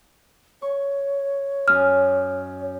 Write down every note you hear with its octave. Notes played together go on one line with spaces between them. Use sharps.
C#5 C#6
F#2 D#5 F6